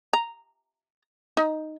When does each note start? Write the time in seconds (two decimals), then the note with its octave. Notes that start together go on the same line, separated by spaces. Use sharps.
0.13 A#5
1.37 D#4